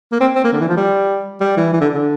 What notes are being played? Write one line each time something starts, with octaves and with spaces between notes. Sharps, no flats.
A#3
C4
C4
A#3
D3
E3
F3
G3
G3
E3
E3
D3
D3